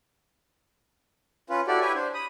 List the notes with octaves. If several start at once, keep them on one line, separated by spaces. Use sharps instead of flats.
C#4 F4 B4
E4 F#4 G4 A4 D5
E4 G4 B4 C#5 E5 G#5
D4 C5
B5 D#6